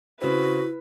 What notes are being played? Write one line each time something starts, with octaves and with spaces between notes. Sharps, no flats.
C#3 C4 E4 F#4 B4